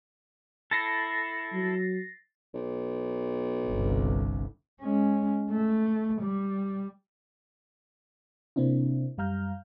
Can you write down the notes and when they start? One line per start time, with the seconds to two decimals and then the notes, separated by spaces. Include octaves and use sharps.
0.71 E4 A4 A6 A#6 C7
1.53 F#3
2.54 B1
3.67 G1 C2
4.82 G#3 C#4
5.51 A3
6.21 G3
8.56 C3 A#3 C4 D4 E4
9.18 F#2 G3 F5 A#5 F6 G6